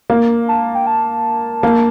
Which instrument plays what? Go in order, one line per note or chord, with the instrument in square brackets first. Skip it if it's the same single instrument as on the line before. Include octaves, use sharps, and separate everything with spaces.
[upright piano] A#3
[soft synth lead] A5
G5
A5
[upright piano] A#3